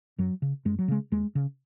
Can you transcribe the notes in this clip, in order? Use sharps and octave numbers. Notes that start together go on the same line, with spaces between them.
F#2 F#3
C#3
F#2 G#3
F#3
C#3 G#3
D#2 G#3
C#3